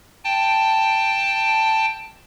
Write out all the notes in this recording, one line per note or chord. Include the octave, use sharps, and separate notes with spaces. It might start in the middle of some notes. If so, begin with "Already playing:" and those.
G5 A5